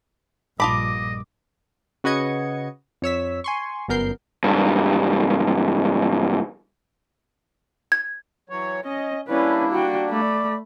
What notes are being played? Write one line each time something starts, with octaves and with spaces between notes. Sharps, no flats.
A#1 G2 F4 D#5 A5 B5 D6
C#3 F#4 B4 D#5 G#6 C#7
F2 C#5 E6 B6
G#5 C6 C#6
G1 F#2 B3 A#4 G6 C7
C#2 G2
G#6
E3 F#3 C#5
C#4 D#5
G3 A#3 C#4 D4 E4 B4
F#4 G5
A3 D5 B5